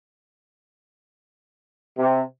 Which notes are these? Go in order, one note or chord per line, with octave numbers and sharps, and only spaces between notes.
C3